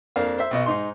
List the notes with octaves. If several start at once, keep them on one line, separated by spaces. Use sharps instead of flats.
F2 A#3 D4 F5
C5 E5
B1 B2 D#5
G#2 D#4 C6